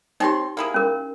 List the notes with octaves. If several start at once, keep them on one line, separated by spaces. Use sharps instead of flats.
C4 D#4 G4 C#5 C6
A#3 E4 G#4
C#4 A#4